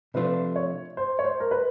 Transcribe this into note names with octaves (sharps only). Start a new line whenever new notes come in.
C3 F3 A3 D4 F4 B4
C#5
C5
C#5
C5
A#4
B4